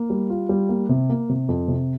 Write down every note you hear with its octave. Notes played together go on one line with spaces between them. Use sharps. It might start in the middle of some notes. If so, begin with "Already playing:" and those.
Already playing: A#3
G3
F4
G3
A#3
C3
A#3
C3
F2
C3